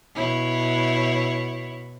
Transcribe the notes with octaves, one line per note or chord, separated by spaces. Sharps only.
B2 E4 C#5